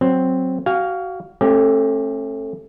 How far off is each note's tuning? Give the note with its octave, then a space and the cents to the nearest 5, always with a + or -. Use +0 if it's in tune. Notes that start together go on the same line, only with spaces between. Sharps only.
F#3 +0 C4 +0
F#4 +25 F5 +0 G#5 -35
A3 +0 C#4 -45 G4 +0